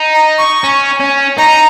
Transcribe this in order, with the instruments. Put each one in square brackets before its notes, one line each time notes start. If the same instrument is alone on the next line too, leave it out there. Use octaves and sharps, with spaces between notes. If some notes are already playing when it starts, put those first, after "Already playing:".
Already playing: [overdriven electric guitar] D#4
[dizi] A#5
C#6
[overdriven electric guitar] C#4
C#4
[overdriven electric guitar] D#4 [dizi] A#5